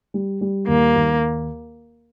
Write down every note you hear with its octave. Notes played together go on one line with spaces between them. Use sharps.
G3
G3
D#2 A#3
D#2